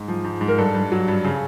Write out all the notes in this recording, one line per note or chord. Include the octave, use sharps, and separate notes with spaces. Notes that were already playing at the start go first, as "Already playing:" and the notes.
Already playing: G#2
F3
G#2
G#2
A#4
G2 A4
G2
F#3
G2
C#3